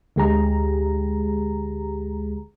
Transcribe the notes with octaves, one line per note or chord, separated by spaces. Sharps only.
D2 D3 G#3 G4 G#4 A#5